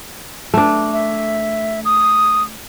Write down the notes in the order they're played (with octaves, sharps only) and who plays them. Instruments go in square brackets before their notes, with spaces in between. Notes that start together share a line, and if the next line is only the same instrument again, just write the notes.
[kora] A3 D4
[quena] E5
D#6